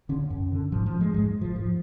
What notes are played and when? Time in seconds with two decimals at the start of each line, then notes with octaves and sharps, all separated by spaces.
0.09 D3 C#4
0.30 F#2
0.52 D3
0.72 G#2 F3
0.86 F3
1.01 G#3
1.14 G#2 G#3
1.41 F3
1.56 G#2 F3